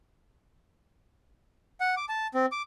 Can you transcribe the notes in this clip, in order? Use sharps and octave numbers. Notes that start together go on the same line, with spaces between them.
F#5
D6
A5
C4
D6